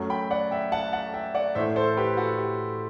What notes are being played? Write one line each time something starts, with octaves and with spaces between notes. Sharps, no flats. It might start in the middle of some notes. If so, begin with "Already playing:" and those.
Already playing: F#2 F#3 A3
G5 B5
D5 F#5
E5 G5
F#5 A5
F#5 A5
E5 G5
D5 F#5
A2 E3 A3 C5 E5
A4 C5
G4 B4
F#4 A4
G4